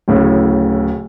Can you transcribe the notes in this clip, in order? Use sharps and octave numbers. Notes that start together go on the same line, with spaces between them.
D1 A2 C#3